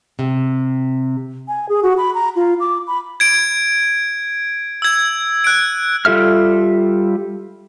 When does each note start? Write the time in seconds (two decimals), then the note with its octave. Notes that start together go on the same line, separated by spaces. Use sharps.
0.19 C3
1.48 G#5
1.69 G#4
1.83 F#4
1.98 B5
2.14 A#5
2.36 F4
2.60 D6
2.87 B5
3.20 G#6 D7
4.82 E6 G#6
5.44 F#6 D7
6.05 G3 F4 A4 E5 F6